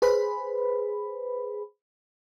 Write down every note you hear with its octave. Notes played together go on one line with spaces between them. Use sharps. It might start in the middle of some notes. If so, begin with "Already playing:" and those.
G#4 B4 C5 B5